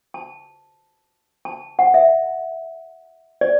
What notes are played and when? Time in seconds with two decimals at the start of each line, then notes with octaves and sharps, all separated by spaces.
0.14 A5
1.45 A5
1.79 F#5
1.94 E5
3.41 D5